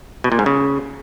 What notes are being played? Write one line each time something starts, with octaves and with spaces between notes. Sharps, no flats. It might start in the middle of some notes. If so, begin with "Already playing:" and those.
B2
A#2
G#2
C#3